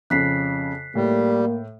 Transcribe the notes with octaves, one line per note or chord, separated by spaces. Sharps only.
F2 C#3 F#6 B6 C7
A2 G3 A#3